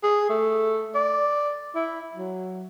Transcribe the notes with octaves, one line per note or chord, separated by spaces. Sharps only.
G#4
A3
D5
E4
F#3